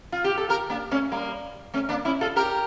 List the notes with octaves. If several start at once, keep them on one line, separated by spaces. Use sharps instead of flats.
F4
G4
A4
G4 A#4
A#3 D4
A3 C#4
G3 A#3
A3 C#4
A#3 D4
C#4 E4
F4 A4
G4 A#4